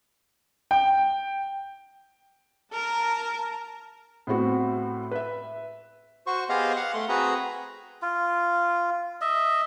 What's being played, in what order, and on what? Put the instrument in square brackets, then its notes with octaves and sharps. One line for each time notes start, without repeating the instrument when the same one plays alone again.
[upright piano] G5
[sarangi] A#4 [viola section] A5 A#5
[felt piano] A2 B3 C4 F#4
B4 E5
[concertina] F#4 C5 C#6
B3 G4 G#4 C5 D#5 F5
F5 F#5
A3 C6
C4 F#4 G#4 B4 A#5
[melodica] F4
D#5 E5